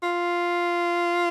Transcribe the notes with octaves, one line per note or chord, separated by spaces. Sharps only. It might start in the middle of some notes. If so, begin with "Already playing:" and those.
F4